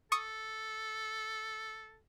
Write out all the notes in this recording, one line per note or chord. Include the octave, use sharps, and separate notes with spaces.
A4 C#6 D#6